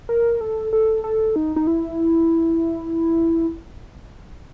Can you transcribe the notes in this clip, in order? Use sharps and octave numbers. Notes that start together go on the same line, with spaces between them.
A#4
A4
A4
A4
D#4
D#4
E4